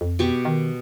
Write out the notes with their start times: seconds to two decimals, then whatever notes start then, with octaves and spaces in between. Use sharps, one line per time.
0.01 F2
0.19 B2 G4 C#6
0.45 D#3